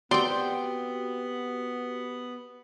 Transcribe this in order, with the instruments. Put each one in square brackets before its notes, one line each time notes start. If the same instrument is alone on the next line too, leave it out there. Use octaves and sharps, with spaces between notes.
[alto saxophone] B3 [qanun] C4 G5 [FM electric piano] F#4 G4 F#5 [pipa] D5 C6